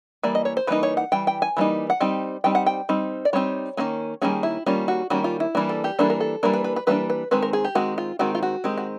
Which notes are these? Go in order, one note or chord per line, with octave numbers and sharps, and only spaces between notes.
E3 G3 A#3 D5
D#5
C#5
C5
E3 G3 A#3 D#4 B4
C#5
F#5
E3 G3 G5
G5
G#5
E3 G3 A#3 D#4
F#5
G3 C4 D#4 G5
G3 C4 D#4 G5
F#5
G5
G3 C4 D#4
D5
G3 C4 D#4 C#5
D#3 G3 A#3 C#4
D#3 G3 A#3 C#4 G#4
E4
D#3 G3 A#3 C#4 F4
F#4
D#3 G3 A#3 C#4 F#4
F4
E4
E3 G3 A#3 D4
A4
G4
E3 G3 A#3 D4 A4
A#4
A4
E3 G3 A#3 D4 A#4
B4
B4
B4
E3 G3 A#3 D4 B4
B4
D#3 G#3 C4 B4
A#4
G#4
G4
D#3 G#3 C4 F#4
F4
D#3 G#3 C4 F#4
F4
F#4
D#3 G#3 C4 G4
F#4